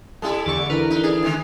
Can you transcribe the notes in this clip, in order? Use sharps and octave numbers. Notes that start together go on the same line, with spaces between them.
G3 A3 E4 A4
E2 D3 C#6 D6 A6
D3 E3 A#4 B4 F6
D#4
D4 G#4
D#3 G#3 A3